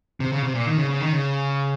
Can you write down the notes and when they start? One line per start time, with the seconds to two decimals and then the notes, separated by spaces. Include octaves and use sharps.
0.20 C3
0.32 C#3
0.43 C3
0.55 A#2
0.67 D#3
0.78 C#3
0.90 C#3
1.01 D#3
1.13 C#3